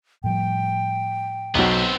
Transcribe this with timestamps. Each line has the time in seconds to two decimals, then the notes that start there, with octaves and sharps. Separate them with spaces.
0.24 A2 F3 G3 G5
1.55 B1 F#3 B3 C4